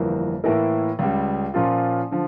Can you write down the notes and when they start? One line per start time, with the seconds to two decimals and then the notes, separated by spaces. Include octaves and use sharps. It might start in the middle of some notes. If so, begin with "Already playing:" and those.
Already playing: G1 F2 E3 A#3
0.44 A2 E3 A#3 E4 A#4
0.99 C#2 C#3 G3
1.54 A#2 F3 A#3 C#4 F4
2.11 D3 F3